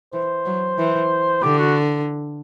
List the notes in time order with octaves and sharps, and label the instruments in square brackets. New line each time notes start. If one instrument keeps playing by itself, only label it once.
[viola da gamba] E3 [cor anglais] C5
[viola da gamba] F#3
E3
[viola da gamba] D3 [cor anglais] G4
[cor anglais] F#4